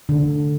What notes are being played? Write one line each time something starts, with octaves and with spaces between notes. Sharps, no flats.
D3